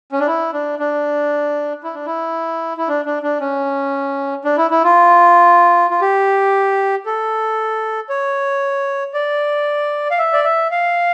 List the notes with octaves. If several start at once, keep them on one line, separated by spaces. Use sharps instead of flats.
C#4
D4
E4
D4
D4
E4
D4
E4
E4
D4
D4
D4
C#4
D4
E4
E4
F4
F4
G4
A4
C#5
D5
F5
E5
D5
E5
F5